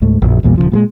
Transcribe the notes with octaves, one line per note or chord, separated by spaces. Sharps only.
C#2 G#2 A3
A#1 F#2 F#3
A#1 E2 A#2 G3
D#1 C2 C#3 F3
A#2 G3 G#3